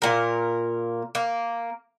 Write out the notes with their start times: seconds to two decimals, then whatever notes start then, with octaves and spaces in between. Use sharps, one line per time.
0.02 A#2 A#4
1.15 A#3